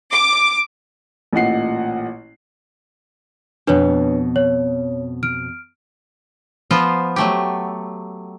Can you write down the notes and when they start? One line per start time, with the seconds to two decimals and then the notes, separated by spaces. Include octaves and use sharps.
0.11 D6
1.33 A1 A#2 D#5 F#5 C7
3.67 F2 B2 D4 B4 C#5
4.36 C#5
5.23 F6 D7
6.71 F3 B3 F4 C5
7.16 F#3 A3 G4